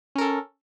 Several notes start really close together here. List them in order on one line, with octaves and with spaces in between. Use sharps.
C#4 A#4 A4